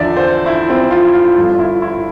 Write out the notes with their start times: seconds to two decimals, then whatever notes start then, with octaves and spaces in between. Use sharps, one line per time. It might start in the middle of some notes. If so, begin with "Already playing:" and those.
Already playing: E2 D3 F3 D5 E5
0.16 C5
0.46 E4
0.69 C4
0.91 F4
1.06 E4
1.14 F4
1.36 G1 G2 F3 F4
1.59 E4
1.82 E4